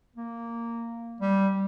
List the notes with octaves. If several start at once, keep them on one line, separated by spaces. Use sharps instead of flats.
A#3
G3